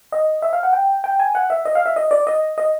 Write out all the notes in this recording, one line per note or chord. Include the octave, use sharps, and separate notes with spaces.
D#5
E5
F5
F#5
G5
G5
G#5
F#5
E5
D#5
F5
E5
D#5
D5
D#5
D#5